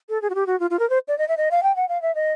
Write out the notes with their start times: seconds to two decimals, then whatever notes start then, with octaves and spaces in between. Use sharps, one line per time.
0.09 A4
0.22 G#4
0.30 F#4
0.35 G4
0.46 F#4
0.60 F4
0.70 F4
0.79 A#4
0.90 C5
1.08 D5
1.18 D#5
1.28 E5
1.37 D#5
1.51 F5
1.63 G5
1.76 F#5
1.89 F5
2.02 E5
2.15 D#5